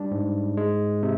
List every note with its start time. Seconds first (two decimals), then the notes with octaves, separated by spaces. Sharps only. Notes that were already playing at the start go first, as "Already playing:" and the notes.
Already playing: G3 D4
0.11 G#2
0.57 G#3
1.03 C3